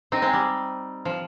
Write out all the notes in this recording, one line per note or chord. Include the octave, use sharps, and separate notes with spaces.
C4 D#4
G#3 C4
G3
F3